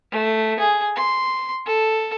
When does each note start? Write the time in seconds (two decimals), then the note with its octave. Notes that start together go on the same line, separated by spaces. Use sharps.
0.11 A3
0.59 G#4
0.96 C6
1.66 A4